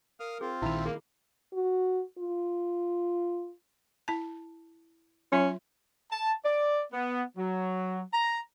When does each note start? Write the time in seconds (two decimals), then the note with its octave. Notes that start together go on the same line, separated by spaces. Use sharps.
0.20 A#4 F5 D#6 F6
0.41 C4 F4 G#4
0.62 A#1 D#3 E4 E5 B5
0.86 A#3 G#4
1.53 F#4
2.18 F4
4.08 E4 A5
5.32 F#3 C#4 F4 E5
6.11 A5
6.44 D5
6.93 B3
7.38 F#3
8.14 A#5